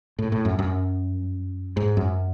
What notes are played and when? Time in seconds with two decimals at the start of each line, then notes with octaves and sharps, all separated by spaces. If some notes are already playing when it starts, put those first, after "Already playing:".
0.19 A2
0.32 A2
0.45 F#2
0.59 F#2
1.77 G#2
1.97 F#2